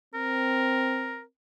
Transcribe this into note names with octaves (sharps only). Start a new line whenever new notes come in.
C4 A#4